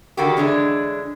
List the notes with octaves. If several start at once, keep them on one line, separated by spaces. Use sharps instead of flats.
D3 D#3 A#3 F#4 G4
D3 E3 G#3 C#4 D4